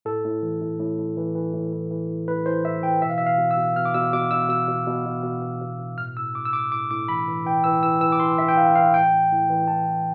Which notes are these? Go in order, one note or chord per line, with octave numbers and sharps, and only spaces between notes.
A2 A4
A2
E3
A2
A2
A2
E3
E3
A2
E3
E3
A2
A2 B4
E3 C5
A2 E5
E3 G5
B2 E5
F5
E5
B2
F5
B2
E6
B2
B2 F6
D6
B2 E6
B2 D6
B2 E6
B2 E6
B2
B2
B2
B2
B2
B2
B2
A2 F6
A2 E6
A2 D6
E6
A2 D6
A2 D6
A2 D6
E3 B5
E3
E3 G5
E3 E6
E3 E6
E3 E6
D6
E3 C6
E3 E5
G5
E3 F5
E3 F5
A2 G5
A2
A2
E3
E3 A5
E3